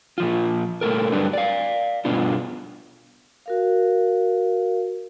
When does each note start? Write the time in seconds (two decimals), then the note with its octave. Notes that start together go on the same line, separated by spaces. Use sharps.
0.18 A#2 F3 F4
0.81 A#2 A3 A4 A#4
1.12 G2 D3 F#3 G3 D4 B4
1.33 D5 F5
2.05 G2 B2 B3 D4 F4
3.46 F#4 A#4 F5